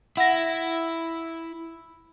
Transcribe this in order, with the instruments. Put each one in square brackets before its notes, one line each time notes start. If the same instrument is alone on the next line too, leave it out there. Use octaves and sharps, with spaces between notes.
[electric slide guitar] E4 [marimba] F#5 A#6